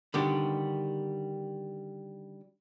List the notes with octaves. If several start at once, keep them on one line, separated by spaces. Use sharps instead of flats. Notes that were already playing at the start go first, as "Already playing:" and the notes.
D3 D#3 G3 B3 D4 G4